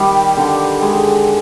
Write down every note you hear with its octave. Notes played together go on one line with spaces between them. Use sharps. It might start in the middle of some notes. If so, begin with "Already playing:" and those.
Already playing: D#3 G3 G4
D3
G#3